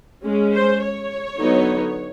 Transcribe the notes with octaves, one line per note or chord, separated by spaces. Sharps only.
G#3 C#4
C5
C#5
D3 F#3 B3 D#4